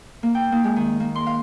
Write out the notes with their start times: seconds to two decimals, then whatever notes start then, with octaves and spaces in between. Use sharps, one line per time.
0.23 A#3
0.35 G5
0.52 A#3
0.64 G#3
0.76 D#3
1.00 A#3
1.15 C6
1.27 F5